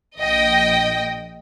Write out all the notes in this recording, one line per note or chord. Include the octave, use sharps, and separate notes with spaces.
A#1 D#5 G5